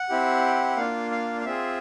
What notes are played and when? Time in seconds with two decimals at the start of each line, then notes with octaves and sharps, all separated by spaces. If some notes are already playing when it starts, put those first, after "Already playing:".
Already playing: F#5
0.09 C4 E4 G4
0.76 A#3 D4 F4 F5
1.11 F5
1.41 F5
1.45 C4 F4 G#4 E5